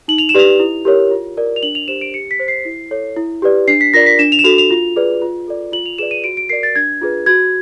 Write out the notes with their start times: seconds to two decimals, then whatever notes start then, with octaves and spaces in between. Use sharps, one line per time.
0.08 D#4 F#7
0.18 F7
0.29 E7
0.34 G4 B4 D5 F7
0.60 E4
0.85 G4 A#4 C#5
1.11 F4
1.37 A#4 D5
1.56 F7
1.63 D4 F#7
1.75 F7
1.88 G4 C5 E7
2.01 D7
2.14 G4 C#7
2.31 B6
2.40 C5
2.48 C7
2.65 E4
2.91 A4 C#5
3.16 E4
3.42 G4 B4 D5
3.68 D4 C7
3.81 B6
3.94 F4 A#4 D5 A#6
4.06 B6
4.19 D4 E7
4.32 F7
4.39 E7
4.44 F#4 A4 F7
4.58 F7
4.70 F4
4.96 G#4 B4 D5
5.22 F4
5.48 A4 D5
5.73 F4 F#7
5.86 F7
5.98 G#4 B4 D5 E7
6.11 D#7
6.24 F#4 D7
6.37 D7
6.49 A#4 D5 C7
6.63 A6
6.76 D4 G#6
7.02 F4 G#4 B4
7.26 F#4 G#6